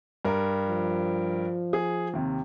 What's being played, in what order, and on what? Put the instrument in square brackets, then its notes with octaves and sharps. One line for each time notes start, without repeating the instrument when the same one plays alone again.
[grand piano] G2 A#4
[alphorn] F3
[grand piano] G#4
D#2 C3